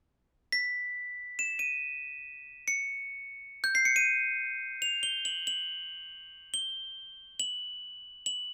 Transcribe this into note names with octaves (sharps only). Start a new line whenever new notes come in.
B6
E7
D#7
C#7
G6
C7
C#7
D#7
F7
G7
F#7
F#7
G7
F#7
F#7